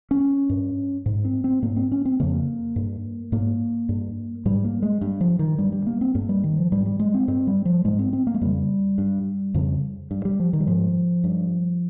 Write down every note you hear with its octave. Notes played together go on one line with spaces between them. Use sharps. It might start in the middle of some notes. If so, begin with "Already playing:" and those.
C#4
G2
G#2
C4
C4
G#2 A#3
C4
C#4
C4
F2 C#3 A#3
G2
G#2 A#3
G2
G#2 G3
A#3
G#3
G2
F3
D#3
G2 G3
G3
A#3
C4
G2 A#3
G3
D#3
F3
G#2 G3
G3
G#3
C4
G2 C4
G3
F3
G#2 G#3
C4
C4
A#3
G#3
F2 C#3 G3
G2
F2 C#3
G2
G3
F3
D#3
G3
G#2 F3
G2